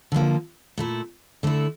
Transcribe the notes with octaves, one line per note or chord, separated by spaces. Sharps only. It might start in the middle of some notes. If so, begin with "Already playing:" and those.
D3 F3 A#3
A#2 A3 E4
D3 A3 E4